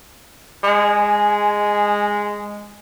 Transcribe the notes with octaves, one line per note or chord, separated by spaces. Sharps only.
G#3 G#5